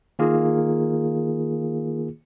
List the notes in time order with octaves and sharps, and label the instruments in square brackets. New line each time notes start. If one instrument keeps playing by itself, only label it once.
[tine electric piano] D#3 A#3 F4 G#4